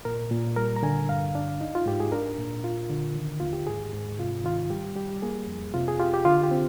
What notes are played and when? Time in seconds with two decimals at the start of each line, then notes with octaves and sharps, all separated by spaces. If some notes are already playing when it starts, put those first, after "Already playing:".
0.05 A#2 A#4
0.31 A#2
0.56 G3 A#4
0.76 A#5
0.83 D3 G#5
1.09 G2 F5
1.35 D4
1.61 D#4
1.75 F4
1.86 G#2 G4
2.00 G#4
2.12 D4 A#4
2.38 A#2
2.64 F4
2.90 D3
3.15 D#3
3.40 D#2 F4
3.53 G4
3.67 G#2 G#4
3.93 G#2
4.19 C3 F4
4.44 D#3 F4
4.70 G3 G4
4.96 G3 G4
5.22 A#3 G#4
5.48 F2
5.74 C3 F4
5.88 G#4
5.99 F4 G4
6.14 G4
6.25 D3 F4
6.43 G4
6.51 C4